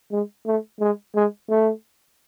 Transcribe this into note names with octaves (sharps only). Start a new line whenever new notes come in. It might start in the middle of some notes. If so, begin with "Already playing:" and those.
G#3
A3
G#3
G#3
A3